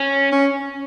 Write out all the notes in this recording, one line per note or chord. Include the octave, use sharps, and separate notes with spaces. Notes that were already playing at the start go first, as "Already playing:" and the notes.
Already playing: C#4
C#4